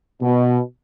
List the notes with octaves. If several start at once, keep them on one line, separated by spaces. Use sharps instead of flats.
B2